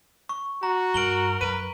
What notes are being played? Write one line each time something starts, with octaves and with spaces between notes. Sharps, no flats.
C#6
F#4 A#5
G2 A#4 D7 F#7 G7
F#2 B4 D#7